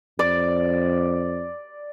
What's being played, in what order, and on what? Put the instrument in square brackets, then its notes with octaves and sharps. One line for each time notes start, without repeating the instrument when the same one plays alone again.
[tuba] F2 [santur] D5